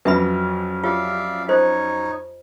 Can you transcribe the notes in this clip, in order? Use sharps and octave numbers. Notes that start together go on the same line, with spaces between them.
F2 F#3 C#4 B4 E5 B5
F4 G4 C#5 D5 E5 F5
D#4 F4 C5 C#5 D#5